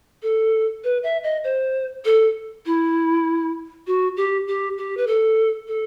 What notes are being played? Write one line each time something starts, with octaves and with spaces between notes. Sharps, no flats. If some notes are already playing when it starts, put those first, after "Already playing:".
A4
B4
E5
D#5
C5
A4
E4
F#4
G4
G4
G4
B4
A4
A4